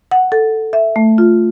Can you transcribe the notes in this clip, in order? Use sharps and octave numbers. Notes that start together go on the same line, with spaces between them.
F#5
A4
E5
A3
F4